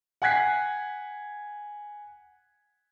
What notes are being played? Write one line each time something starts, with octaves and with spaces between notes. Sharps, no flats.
F#5 G#5 F#6 G#6 B6 C7